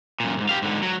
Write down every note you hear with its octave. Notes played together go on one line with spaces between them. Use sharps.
F#2 A#2
B1 G#2
G4 F5
G#2 D3
F#3